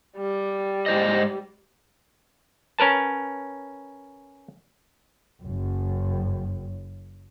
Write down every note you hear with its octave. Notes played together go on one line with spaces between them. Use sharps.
G3
G#2 C5 D#5
C#4 A#4 B4 A5
F#1 F#2